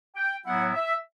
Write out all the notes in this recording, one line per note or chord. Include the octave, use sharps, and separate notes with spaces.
G5
A2 F#3 B3 E4 F#5
E5